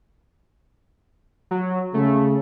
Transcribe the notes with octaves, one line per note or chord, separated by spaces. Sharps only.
F#3
C#3 A3